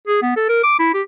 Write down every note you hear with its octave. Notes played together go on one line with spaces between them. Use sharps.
G#4
B3
A4
A#4
D6
E4
G4